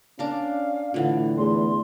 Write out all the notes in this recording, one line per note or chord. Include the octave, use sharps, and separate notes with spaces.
C#4 D4 A#4 F5
A2 D3 E3 F4 F#5
E2 A3 B4 C6